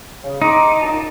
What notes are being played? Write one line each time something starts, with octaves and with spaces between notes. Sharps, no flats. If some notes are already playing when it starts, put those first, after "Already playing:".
C#3
D#4 C6 D6
F#2 A#2 A5